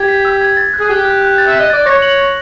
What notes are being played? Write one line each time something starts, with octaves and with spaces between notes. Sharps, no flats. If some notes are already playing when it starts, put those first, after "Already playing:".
Already playing: G4 G#6
B6
E6
G#6
A6
F#6
G#4
G4 F#6
F#6
F#6
A6
E5
F#6
D#5
D5 A6
C#5 A#6
F#7
A#6